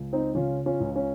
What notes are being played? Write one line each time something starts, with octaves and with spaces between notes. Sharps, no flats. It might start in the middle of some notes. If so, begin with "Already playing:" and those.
Already playing: C#2
C4 D#4
C#3 C#4 F4
C#4 F4
C#2
C#4